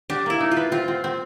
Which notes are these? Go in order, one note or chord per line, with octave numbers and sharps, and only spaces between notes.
D4 G4
A#3 E4
D#4
F4
B4
C4 F4
C4
C4